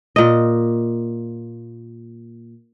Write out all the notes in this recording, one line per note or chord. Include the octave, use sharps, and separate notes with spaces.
A#2 D#5